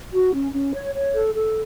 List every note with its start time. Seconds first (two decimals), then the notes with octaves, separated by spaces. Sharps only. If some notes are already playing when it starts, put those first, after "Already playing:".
0.13 F#4
0.34 C#4
0.54 C#4
0.74 C#5
0.94 C#5
1.14 A4
1.34 A4